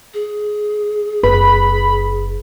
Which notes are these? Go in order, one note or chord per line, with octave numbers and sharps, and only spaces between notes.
G#4
F#1 B4 B5